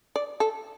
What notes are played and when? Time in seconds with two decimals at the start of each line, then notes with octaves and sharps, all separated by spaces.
0.16 D5
0.40 A4